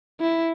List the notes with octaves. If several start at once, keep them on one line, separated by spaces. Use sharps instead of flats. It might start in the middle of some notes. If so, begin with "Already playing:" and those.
E4